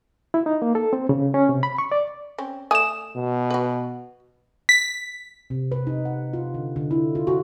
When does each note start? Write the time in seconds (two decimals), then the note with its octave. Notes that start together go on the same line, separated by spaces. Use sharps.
0.34 E4
0.46 D#4
0.62 A#3
0.75 A4
0.93 C4
1.09 C#3
1.34 C#4
1.49 C3
1.63 B5
1.78 C#6
1.92 D5
2.38 C4 C#4
2.71 A3 D5 G#5 D#6 E7
3.16 B2
3.50 F#4 B4
4.69 B6
5.50 C3
5.72 B4
5.87 D#4
6.05 F#5
6.33 F4
6.54 D3
6.76 D3
6.91 E4
7.15 F4
7.27 F#4